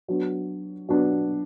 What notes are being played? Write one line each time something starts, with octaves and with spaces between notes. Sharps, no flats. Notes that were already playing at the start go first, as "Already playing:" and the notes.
F#3 B3 D4
F#3 B3 D4